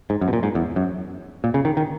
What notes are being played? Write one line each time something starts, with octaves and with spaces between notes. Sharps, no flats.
G#2
F#2
B2
A#2
G#2
E2
F#2
A#2
C#3
D#3
D#3